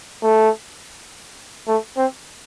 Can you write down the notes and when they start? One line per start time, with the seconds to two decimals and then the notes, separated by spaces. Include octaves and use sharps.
0.22 A3
1.68 A3
1.97 C4